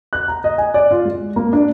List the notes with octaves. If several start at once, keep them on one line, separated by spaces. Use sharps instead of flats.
F#6
A#5
D#5
G#5
D5
F4
G#3
A#3
D4